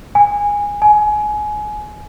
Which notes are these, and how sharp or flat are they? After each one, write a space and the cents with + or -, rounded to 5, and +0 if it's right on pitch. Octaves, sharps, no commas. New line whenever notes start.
G#5 -15
G#5 +25